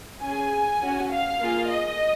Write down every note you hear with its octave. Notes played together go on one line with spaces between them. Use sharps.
C#4 G#4 G#5
C#4 F#4
F5
A#3 F4 G#4
D#5